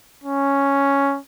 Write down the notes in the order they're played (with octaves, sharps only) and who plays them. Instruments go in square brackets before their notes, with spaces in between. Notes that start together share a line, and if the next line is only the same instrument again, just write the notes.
[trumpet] C#4